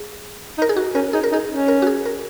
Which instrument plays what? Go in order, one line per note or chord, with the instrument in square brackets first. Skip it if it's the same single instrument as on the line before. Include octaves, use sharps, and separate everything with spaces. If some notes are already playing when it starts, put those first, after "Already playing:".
Already playing: [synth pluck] G#4
[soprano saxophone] D#4
[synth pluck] A#4
G#4
F#4
[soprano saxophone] C#4 [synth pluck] A#4
[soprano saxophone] D#4 [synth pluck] G#4
[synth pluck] A#4
[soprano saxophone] D#4 [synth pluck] G#4
[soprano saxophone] C#4
[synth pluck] A#4
F#4
G#4
A#4